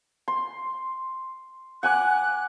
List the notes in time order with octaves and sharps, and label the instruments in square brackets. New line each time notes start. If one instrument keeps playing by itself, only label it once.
[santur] C6
[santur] F#5 G#5 D6 [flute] F#6